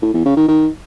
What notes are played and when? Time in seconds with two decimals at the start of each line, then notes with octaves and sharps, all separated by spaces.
0.02 A2
0.14 E2
0.25 C#3
0.37 D#3
0.48 D#3